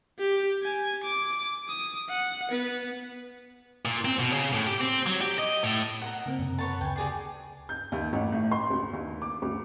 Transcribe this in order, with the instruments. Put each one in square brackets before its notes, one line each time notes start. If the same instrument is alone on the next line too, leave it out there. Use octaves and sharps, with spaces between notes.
[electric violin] G4
G#5
D6
D#6
F#5
B3 B4
[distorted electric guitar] A#2
C4
B2
C#3
A2
G4
C4
F#3
G4
D#5
A2
[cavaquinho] F#5 A#5
[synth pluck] C#3 A#3 C4
F#2 C3
[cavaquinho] B4 C#5 A5
[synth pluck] D2 C#3 [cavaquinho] G5 G#5
[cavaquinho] G4 G#4 D5 [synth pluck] C7
[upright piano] G6
D#2
A1
A2
C6
D2
D#2
D6
D2